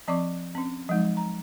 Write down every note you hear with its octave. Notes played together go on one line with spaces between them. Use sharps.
F3 C4 D5 C#6 D6
C4 C#4
F3 F#3 G#3 D#4
A#5